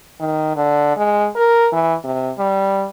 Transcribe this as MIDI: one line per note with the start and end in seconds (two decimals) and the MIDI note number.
0.20 0.56 51
0.56 0.94 50
0.97 1.28 56
1.36 1.67 70
1.73 1.94 52
2.04 2.31 48
2.38 2.86 55